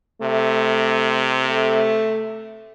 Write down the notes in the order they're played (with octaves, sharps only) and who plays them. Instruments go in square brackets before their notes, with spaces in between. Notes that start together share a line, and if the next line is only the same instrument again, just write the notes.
[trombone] C3 [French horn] A3
[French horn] A3